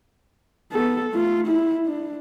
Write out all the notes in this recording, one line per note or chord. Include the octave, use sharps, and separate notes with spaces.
B3 A4
A3 F4
E4
D4